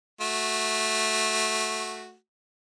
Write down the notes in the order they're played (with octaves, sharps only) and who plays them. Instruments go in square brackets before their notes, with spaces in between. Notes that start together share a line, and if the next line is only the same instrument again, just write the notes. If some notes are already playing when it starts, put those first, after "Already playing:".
[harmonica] A3 F#4